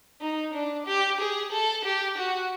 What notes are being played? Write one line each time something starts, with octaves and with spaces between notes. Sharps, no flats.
D#4
D4
G4
G#4
A4
G4
F#4